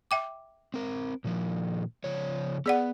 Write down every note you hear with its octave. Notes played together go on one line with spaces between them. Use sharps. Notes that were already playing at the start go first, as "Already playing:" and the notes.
E5 G5 D6
C4 A#4
A#2 D#3 F3
C#3 F3 C#5
B3 G#4 D5 F#5